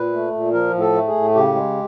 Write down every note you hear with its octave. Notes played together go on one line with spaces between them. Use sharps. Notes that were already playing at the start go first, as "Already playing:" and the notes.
Already playing: A#2 B4
A3
A#2
F3 A#4
A2
A4
A3
G#4
A2
C#3 G4
G#3